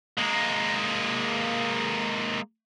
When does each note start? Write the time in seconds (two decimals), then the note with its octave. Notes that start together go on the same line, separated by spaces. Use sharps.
0.18 G#3 A#3